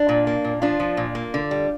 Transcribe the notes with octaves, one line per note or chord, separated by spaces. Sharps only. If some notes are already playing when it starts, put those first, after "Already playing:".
Already playing: D4
A#2
A#3
A#2
F3 D4 F4
F3
A#2
A#3
D3
G3